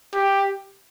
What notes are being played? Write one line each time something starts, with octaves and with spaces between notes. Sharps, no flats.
G4